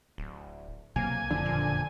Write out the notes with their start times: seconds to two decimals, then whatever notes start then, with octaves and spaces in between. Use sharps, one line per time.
0.18 D1
0.96 B1 C3 F#3 A#3 G#5
1.31 F#1 F2 D3 F3
1.46 A#2